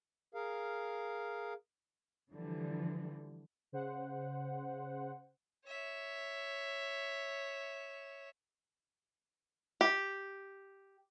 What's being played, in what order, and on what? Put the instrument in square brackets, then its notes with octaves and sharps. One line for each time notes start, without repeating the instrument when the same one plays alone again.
[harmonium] G#4 A#4 F5
[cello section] D3 E3 F3 G3
[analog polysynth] C#3 C5 F#5
[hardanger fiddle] C#5 E5
[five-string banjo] G4